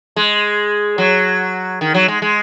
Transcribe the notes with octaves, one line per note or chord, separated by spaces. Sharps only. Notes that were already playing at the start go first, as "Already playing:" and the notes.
G#3
F#3
D#3
F#3
G#3
G#3